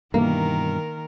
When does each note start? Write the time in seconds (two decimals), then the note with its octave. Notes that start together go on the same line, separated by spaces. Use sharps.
0.14 G2 B2 D#3 E3 A#3 A#4